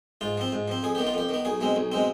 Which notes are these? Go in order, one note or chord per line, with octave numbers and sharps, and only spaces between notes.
G#2 F4
F3 C4
G#2
F3 C4
F2 G#4
D#3 B3 G4
F4
F2 G4
D#3 B3
B1 G#4
B2 G#3 C4
B1
B2 G#3 C4